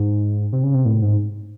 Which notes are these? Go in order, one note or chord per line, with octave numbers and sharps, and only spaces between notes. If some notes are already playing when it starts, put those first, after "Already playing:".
Already playing: G#2
C3
C#3
C3
A2
G#2